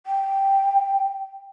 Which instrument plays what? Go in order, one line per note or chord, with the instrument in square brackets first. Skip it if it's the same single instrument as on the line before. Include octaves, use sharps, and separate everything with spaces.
[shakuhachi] G5